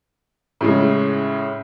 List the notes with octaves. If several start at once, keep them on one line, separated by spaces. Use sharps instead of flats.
A2 C#3 G#3